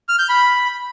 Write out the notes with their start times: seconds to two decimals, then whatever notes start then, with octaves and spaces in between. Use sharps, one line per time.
0.09 F6
0.19 G6
0.29 B5